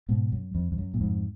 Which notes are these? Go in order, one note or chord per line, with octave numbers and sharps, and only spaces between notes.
G#2 B2
F#2
F2
F2
F#2
A#2
F2 G#2